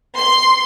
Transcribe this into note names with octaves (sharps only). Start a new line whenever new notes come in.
C6